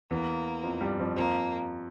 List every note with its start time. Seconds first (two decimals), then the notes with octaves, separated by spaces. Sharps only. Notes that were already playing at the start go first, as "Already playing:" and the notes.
0.11 E2 E3 A#3
0.63 F2 F3
0.81 G2 G3
0.99 F2 F3
1.16 F2 F3 A#3